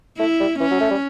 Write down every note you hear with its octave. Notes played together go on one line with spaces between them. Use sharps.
A3 E4
G3
E3 C#4
F#3
A3
G3